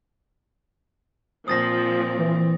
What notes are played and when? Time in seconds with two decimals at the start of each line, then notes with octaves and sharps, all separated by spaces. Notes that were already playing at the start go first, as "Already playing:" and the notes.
1.48 A#2 F3 C4 D#6 A6 A#6
2.19 E3